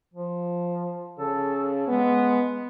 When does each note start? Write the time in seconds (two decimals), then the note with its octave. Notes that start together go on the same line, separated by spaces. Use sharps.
0.14 F3
1.19 C#3 A4
1.88 G#3 B3